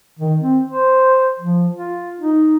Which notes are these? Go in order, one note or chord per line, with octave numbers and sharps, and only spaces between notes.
D#3
C4
C5
F3
F4
D#4